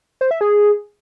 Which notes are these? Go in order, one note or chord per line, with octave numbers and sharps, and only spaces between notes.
C5
E5
G#4